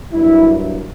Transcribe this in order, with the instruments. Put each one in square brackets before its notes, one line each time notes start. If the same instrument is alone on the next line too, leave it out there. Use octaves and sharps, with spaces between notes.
[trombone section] G2 F#3 A#3 E4